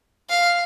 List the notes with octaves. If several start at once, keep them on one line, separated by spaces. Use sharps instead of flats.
F5